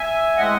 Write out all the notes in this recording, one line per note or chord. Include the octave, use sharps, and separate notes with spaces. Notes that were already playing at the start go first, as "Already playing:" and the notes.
Already playing: E5 G#5
A2 G#3 C4 D#5 F#5